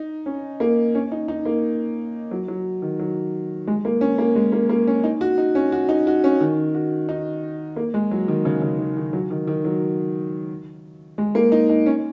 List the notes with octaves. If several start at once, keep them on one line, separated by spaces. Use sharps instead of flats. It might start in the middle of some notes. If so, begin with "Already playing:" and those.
Already playing: D#4
C#4
A#3
C#4
D#4
D#4
A#3
F#3
F#3
D#3
F#3
G#3
A#3
C#4
A#3
G#3
A#3
A#3
C#4
D#4
F#4
D#4
C#4
F#4
D#4
F#4
C#4
D#3
F#4
D#4
A#3
G#3
F#3
D#3
C#3
C#3
D#3
D#3
F#3
D#3
D#3
F#3
G#3
A#3
D#4
D#4
C#4